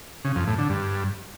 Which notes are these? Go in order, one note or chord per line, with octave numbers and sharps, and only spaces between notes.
C#3
F2
A2
D3
G2